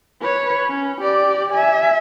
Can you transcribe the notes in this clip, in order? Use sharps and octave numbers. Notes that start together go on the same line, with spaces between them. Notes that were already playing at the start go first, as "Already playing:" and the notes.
B4 C#5
C#4
G4 D5
E5 G#5